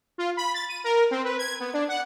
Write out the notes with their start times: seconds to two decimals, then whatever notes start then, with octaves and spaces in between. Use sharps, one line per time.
0.18 F4
0.37 B5
0.54 A6
0.69 D#7
0.84 A#4
1.11 C4
1.24 B4
1.38 G#6
1.60 B3
1.74 D4
1.88 F#5